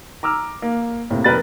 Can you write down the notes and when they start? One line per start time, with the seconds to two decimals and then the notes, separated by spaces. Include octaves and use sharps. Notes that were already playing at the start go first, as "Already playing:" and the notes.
0.23 A#5 D6 E6 F6
0.62 A#3
1.10 A2 C3 A#3
1.24 F1 A#4 B4 A6